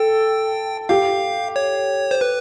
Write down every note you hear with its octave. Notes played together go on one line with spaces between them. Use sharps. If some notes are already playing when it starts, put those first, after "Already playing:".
Already playing: A4 G5
G4 F5
C#5
C5
B4